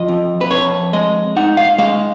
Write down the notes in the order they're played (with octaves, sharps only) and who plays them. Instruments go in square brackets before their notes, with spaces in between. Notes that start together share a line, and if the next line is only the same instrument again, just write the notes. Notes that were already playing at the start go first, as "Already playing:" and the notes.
Already playing: [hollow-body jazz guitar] F3 D#5
F2
B4
F2 C#5
G#3 D#5
D#4 F#5
F5
G#3 F5